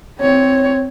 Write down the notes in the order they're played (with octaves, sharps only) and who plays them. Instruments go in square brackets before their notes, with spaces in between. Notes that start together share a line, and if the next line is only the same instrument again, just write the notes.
[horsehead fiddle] C4 C#5